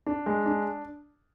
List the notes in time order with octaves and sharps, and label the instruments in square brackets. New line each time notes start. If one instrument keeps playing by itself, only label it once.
[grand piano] D4
G#3
D4